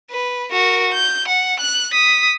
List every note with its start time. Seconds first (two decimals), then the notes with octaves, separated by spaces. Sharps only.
0.11 B4
0.52 F#4 A#4
0.93 G6
1.28 F#5
1.61 F#6
1.93 D#6 B6